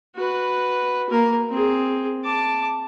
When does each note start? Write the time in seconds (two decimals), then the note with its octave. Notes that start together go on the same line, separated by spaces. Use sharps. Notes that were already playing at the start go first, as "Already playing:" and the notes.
0.16 F#4 B4
1.10 A#3 A#4
1.50 C4 G#4
2.24 A5 D6